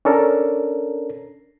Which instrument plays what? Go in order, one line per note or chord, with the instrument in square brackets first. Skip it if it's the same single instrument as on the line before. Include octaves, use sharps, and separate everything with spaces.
[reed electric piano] C#4 D4 A4 A#4